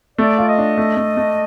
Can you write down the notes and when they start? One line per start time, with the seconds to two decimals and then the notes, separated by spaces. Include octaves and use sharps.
0.18 A3 D5
0.38 F4
0.48 D#5
0.58 D4
0.78 A3
0.97 A3
1.17 A3